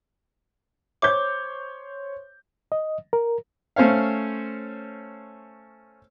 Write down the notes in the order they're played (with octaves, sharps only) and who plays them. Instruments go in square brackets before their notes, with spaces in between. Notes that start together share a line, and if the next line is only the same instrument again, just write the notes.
[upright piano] C5 C#5 G6 [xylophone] D6
[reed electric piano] D#5
A#4
[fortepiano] A3 C#4 C5 C#5 F5